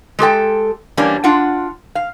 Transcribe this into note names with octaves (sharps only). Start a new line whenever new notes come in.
G#3 G4 A4 G5
E3 G3 A#3 C#4 D4
D4 F4 F#5
F5